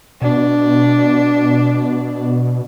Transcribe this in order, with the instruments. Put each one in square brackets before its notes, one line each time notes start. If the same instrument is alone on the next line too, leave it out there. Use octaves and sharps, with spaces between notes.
[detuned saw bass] B2 [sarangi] D4